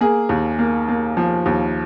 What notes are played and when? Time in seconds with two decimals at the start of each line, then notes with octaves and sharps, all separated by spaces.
0.01 A#3 G#4
0.29 D#2
0.59 A#3
0.88 A#3
1.17 F3
1.46 D#2